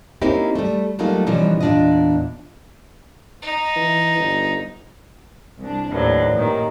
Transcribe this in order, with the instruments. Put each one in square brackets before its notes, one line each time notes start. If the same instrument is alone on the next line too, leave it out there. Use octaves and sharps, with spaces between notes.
[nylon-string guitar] A#3 C4 C#4 D#4 E4 G4
G3 A3
F#3 G3 A3 A#3 D#4 F4
B2 E3 F3 G3 C#4 D#4
E2 A#2 D4 F4 D#5
[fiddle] D#4
[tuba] E3
G1
[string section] C2 D4
[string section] D#2 [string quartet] A2 F#3 [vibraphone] B4 C5 D5
[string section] F#2 [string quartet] A#2 D#3 [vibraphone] G4 D#6